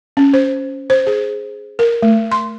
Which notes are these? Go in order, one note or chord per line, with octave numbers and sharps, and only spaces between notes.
C#4
C5
C5
G#4
A#4
A3
C6